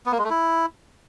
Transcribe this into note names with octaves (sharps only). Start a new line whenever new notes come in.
B3
A#3
G#3
A3
E4